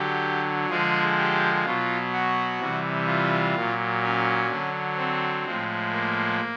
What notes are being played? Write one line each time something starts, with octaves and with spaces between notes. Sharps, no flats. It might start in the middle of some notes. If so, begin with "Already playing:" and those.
Already playing: D3 F#3 G4
D3 F3 G#3 G#4
G4
B2 F#3 F4
F#4
C3 E3 G3
F4
A#2 F#3
C#4
D3 F#3
C4
A2 F3 G#3
A#3